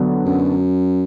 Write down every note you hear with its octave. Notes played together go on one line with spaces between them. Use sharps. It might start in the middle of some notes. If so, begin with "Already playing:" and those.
Already playing: D3 F#3 B3
F#2